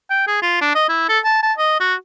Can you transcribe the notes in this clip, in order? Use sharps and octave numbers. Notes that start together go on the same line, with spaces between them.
G5
G#4
F4
D4
D#5
E4
A4
A5
A5
D#5
F#4